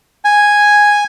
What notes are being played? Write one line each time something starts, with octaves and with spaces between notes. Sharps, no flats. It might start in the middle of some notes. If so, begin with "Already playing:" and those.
G#5